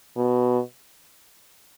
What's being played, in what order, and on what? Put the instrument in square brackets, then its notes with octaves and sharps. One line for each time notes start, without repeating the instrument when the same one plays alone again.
[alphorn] B2